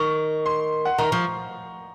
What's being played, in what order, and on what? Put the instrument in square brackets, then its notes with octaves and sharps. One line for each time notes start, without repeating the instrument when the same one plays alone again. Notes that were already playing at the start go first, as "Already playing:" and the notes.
Already playing: [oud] D#3 [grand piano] C#6
[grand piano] C6
F#5
[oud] D#3 [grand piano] A#5
[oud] F3 [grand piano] C#6